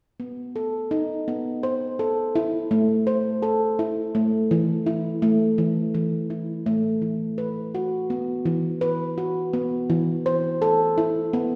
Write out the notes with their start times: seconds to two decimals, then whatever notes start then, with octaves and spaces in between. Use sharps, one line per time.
0.20 B3
0.56 A4
0.91 D#4
1.28 B3
1.63 C5
1.99 A4
2.35 E4
2.71 A3
3.07 C5
3.42 A4
3.79 E4
4.15 A3
4.51 E3
4.86 E4
5.22 A3
5.58 E3
5.95 E3
6.30 E4
6.66 A3
7.02 E3
7.38 B4
7.75 F#4
8.10 B3
8.46 E3
8.81 B4
9.18 F#4
9.53 B3
9.90 E3
10.26 C5
10.62 A4
10.98 E4
11.33 B3